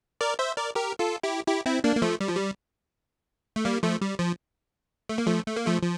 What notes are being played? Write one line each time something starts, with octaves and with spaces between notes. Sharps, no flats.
A#4 D5
C5 E5
A#4 D5
G4 A#4
F4 A4
E4 G4
E4 G4
C4 E4
A#3 D4
A#3
F3 A3
G3
F3
G3
A3
G3 A#3
F3 A3
G3
F3
A3
A#3
F3 A3
A3
A#3
F3 A3
F3